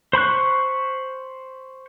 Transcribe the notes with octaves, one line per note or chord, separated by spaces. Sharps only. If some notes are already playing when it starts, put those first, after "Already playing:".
C5 B5 C#6 F#6